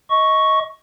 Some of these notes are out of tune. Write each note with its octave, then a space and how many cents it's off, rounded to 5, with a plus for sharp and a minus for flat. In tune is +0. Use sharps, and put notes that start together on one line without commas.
D#5 +20 C#6 +0